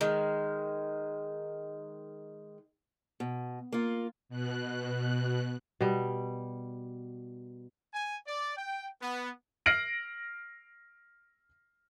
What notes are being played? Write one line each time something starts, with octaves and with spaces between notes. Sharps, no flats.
D#3 G#3
B2
A#3 F4
B2 F#6
B2 G3
G#5
D5
G5
B3
F6 A#6 C7 D7 F#7